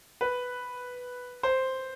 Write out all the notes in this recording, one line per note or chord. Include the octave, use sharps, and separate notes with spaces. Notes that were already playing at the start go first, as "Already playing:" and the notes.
B4
C5